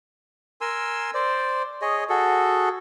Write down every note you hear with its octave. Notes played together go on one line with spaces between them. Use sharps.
A#4 G#5 C6 E6
C5 D5
G#4 C#5 D#5
F#4 G#4 A4